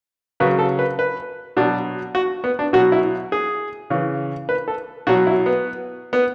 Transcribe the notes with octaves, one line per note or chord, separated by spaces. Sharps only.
C#3 F#3 B4
A4
B4
B4
B2 F#3 D4
F#4
B3
D4
B2 F#3 F#4
E4
G#4
C#3 E3
B4
A4
B2 F#3 F#4
E4
B3
B3